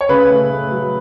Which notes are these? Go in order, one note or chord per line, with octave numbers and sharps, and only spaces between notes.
C#5
C#3 B4
A3
A3
F#3